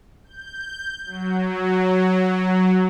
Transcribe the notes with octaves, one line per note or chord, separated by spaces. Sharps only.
G6
F#3